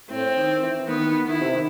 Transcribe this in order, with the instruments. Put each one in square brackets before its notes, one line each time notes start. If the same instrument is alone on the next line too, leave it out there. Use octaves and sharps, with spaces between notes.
[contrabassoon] A2 [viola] C4
[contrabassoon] D#3
E3
[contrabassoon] D#3 [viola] B3
[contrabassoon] D#3 [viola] E4
[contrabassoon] C3
D#3